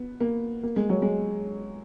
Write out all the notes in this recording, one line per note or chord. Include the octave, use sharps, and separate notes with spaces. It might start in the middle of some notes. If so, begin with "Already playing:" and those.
Already playing: B3
A#3
A#3
G#3
F#3
G#3